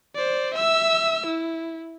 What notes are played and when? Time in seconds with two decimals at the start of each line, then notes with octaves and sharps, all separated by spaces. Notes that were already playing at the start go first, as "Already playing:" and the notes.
0.15 C5 D5
0.54 E5 E6
1.26 E4